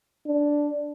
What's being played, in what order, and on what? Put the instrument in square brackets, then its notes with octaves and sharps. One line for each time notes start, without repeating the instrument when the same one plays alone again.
[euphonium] D4